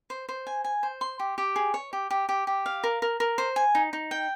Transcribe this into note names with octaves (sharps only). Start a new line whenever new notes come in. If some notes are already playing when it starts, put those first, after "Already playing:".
C5
C5
G#5
G#5
C5
C6
G4
G4
G#4
C#5
G4
G4
G4
G4
F5
A#4
A#4
A#4
C5
G#5
D#4
D#4
G5